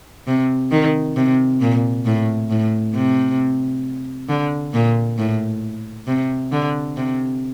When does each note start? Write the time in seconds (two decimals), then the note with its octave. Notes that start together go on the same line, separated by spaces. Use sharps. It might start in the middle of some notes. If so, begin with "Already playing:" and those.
0.27 C3
0.71 D#3
1.16 C3
1.61 A#2
2.05 A2
2.50 A2
2.95 C3
4.29 D3
4.73 A#2
5.18 A2
6.07 C3
6.52 D3
6.96 C3